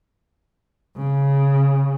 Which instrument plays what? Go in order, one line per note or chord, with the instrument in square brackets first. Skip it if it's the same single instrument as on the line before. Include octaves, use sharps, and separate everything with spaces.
[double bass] C#3